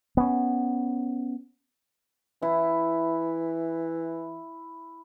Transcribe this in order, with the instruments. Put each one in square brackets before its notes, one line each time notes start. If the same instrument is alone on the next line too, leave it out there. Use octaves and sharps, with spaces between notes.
[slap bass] B3 C#4
[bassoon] E3 [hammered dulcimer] E4